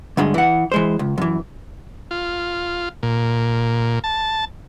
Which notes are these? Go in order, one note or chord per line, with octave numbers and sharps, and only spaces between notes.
D2 G2 D3 G#3
E3 F#5
E3 G#3 C5
C#2
F#2 E3
F4
A#2
A5